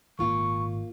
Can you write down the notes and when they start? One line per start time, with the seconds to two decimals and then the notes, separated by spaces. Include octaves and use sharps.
0.19 G#1 A#2 A#3 F4 C#6